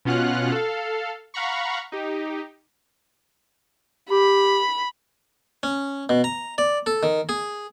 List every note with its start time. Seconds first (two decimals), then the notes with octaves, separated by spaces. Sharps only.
0.05 B2 C#4 F4 F#5 F6 F#6
0.52 A4 F5
1.34 F5 F#5 A#5 B5 C#6
1.92 D#4 G4
4.11 G4 B5
5.63 C#4
6.09 B2
6.24 A#5
6.58 D5
6.86 A4
7.03 D#3
7.29 G#4